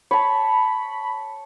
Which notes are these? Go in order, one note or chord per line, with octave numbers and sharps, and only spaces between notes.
C#5 A5 B5